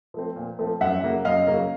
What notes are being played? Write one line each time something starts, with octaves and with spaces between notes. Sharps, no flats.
F3 A3 C4
A#2
F3 A3 C4
F#2 E5 F#5
C#3 F#3 A#3
F#2 D#5 F5
C#3 F#3 A#3